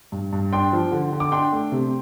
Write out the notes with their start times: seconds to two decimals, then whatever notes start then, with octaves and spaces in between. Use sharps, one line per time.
0.12 G2
0.33 G2
0.53 D4 G5 C6
0.73 F3
0.92 D3
1.12 D3
1.20 D6
1.32 D4 G5 C6
1.52 A3
1.72 C3